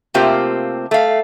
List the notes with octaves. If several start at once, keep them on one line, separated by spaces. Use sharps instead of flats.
C3 A3 A#3 C4 F4 G4
A3 F5